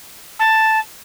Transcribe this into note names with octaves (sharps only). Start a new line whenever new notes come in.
A5